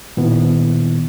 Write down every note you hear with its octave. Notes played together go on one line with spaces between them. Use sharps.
A#2 D#3 B3 E4